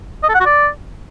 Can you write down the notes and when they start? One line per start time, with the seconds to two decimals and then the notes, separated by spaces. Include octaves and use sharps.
0.24 D#5
0.29 A4
0.35 F#5
0.40 F#4
0.46 D5